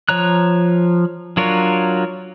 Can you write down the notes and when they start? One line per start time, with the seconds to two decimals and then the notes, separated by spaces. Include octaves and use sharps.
0.09 F3 C#5 A#5 F#6
1.37 F#3 D4 F4 A#4 C#5